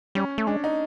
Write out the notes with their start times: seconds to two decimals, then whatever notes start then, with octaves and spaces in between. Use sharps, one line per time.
0.15 G3 C#4
0.38 A3
0.47 G#3 D4
0.64 D#4